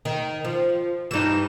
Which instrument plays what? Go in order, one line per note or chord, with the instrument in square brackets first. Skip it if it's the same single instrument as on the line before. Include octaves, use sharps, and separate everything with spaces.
[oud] D#3
F3
[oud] G2 E3 [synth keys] D#4 E7